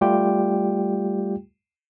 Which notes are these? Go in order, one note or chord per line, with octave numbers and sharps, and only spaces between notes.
G3 A3 F4 G4 G5